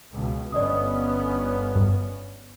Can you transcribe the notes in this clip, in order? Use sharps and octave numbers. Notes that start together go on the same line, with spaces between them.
C#2 B2
G1 B3 C#4 D5 D#5 D#6
G2